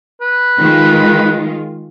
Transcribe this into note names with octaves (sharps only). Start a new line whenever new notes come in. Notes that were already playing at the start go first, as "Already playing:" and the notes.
B4
D#3 G#3 F4